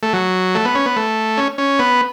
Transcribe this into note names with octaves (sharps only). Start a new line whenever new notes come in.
A3
F#3
A3
B3
C#4
B3
A3
C#4
C#4
B3